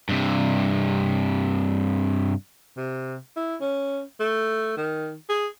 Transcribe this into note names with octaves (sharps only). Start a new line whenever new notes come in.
G2 C3
C3
E4
C#4
A3
D#3
G#4